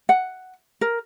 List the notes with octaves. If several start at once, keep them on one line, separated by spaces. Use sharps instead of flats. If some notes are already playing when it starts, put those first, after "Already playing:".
F#5
A#4